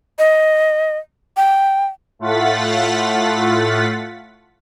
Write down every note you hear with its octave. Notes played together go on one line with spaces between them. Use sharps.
D#5
G5
A2 A3 F4 F#5 A6 B6